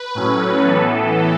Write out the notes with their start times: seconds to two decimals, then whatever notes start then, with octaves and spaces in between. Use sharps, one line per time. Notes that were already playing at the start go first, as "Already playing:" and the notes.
Already playing: B4
0.15 A2 F#3 C#4
0.64 A2 E3 B3 A4